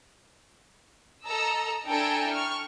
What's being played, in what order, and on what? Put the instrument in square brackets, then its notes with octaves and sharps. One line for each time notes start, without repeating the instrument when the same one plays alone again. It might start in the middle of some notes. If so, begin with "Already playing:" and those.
[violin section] A4 D#5 A#5 E6
D4 E4 A4 G5 G#5 A#5
C#6 F6